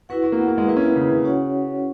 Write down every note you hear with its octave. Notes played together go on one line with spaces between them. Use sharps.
E4 F#4 B4 F#5
F#4
A#3
B3
A#3
G#3
A#3 E4 B4 E5
C#4
B3
C#3
C#3
C#4 F#4 C#5 F#5